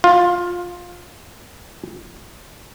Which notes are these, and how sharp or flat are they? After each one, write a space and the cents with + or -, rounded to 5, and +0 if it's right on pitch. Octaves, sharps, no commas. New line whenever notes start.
F4 +15